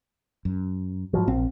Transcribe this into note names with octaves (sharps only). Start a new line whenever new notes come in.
F#2
G#2 F3 F#3
A#1 C4